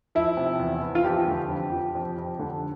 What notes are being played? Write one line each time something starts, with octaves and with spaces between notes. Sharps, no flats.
F3 E4
C3
E2
E2
F4
F2 G4
D3
F2
F3
F2
F2
D3